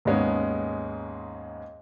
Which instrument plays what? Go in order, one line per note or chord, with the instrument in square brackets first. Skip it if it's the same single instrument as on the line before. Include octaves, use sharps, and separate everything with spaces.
[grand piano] D#2 G#2 G#3 B3 C#4